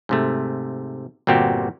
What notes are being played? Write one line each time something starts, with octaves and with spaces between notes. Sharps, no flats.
G#2 C3 A3
G1 A#2 C4 F#4 G4